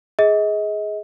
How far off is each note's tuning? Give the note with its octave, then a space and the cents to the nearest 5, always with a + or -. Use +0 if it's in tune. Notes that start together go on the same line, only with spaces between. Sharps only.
G#4 +5 D#5 +35